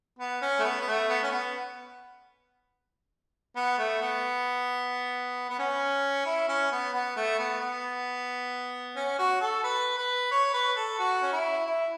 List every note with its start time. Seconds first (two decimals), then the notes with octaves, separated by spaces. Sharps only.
0.19 B3
0.42 C#4
0.59 A3
0.64 B3
0.82 B3
0.87 A3
1.09 B3
1.23 C#4
1.32 B3
3.56 B3
3.79 A3
4.01 B3
5.49 B3
5.59 C#4
6.26 E4
6.49 C#4
6.72 B3
6.94 B3
7.16 A3
7.39 B3
7.61 B3
8.96 C#4
9.18 F#4
9.41 A4
9.64 B4
9.98 B4
10.31 C#5
10.54 B4
10.76 A4
10.99 F#4
11.23 C#4
11.32 E4
11.66 E4